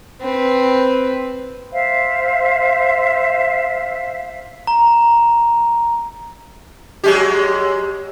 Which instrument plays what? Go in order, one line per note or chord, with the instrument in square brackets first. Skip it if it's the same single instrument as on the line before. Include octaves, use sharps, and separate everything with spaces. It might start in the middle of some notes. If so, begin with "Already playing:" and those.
[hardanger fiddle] C4 B4
[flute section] C5 E5 F5
[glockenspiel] A#5
[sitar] F#3 G#3 G4